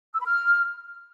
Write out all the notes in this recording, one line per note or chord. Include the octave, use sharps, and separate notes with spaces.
E6
B5
F6